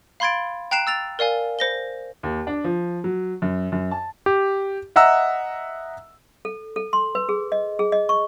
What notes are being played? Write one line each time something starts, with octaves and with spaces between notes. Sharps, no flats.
F5 B5 C6 G#6 A6 D7
G5 A#5 F#6 C7 D7 E7
E6 A6 F7
A#4 D5 F5 G#5
C5 A#6 G7
D#2
D4
F3
F#3
F#2
F#2
A5
G4
D#5 E5 F#5 A#5 E6
A4
A4
C6
B4
G#4
D#5
G#4
D#5
C#6